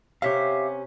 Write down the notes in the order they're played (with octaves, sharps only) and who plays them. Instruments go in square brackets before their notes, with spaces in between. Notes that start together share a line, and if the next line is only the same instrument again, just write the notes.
[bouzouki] C3 C#4 [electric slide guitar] G4 E5 F5